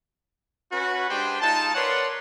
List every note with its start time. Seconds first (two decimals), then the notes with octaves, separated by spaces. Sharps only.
0.71 C#4 F#4 B4
1.09 G#3 D4 G4 B4 C5 G5
1.41 G#3 D#4 F4 A5
1.75 A#4 B4 C#5 D5 F#5 C6